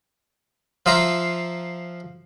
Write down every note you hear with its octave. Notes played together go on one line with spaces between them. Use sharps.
F3 F4 E5 A#5 C6